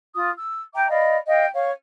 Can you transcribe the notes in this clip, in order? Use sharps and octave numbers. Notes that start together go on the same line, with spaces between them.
F4 D#6
E6
E5 G5 A#5 D6
D5 D#5 F5 B5
D#5 F5 G5
C#5 F5